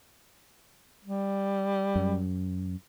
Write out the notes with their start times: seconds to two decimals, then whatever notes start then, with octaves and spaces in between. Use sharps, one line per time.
1.05 G3
1.96 F#2